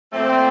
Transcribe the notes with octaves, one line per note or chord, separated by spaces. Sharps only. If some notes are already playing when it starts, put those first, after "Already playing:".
A#2 F3 A3 C4